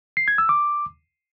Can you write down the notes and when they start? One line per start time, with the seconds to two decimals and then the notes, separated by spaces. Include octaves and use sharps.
0.17 C7
0.28 G#6
0.38 E6
0.49 D6